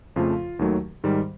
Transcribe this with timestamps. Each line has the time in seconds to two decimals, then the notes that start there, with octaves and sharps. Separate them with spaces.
0.16 F2 C#3 F3 A3 F4
0.59 D#2 D#3 F#3 A3
1.04 G#2 D#3 G3